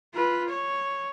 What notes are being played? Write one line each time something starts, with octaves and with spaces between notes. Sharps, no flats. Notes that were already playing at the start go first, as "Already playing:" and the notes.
F4 B4
C#5